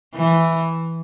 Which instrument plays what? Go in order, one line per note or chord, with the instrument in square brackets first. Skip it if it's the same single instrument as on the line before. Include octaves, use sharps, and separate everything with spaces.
[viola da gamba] E3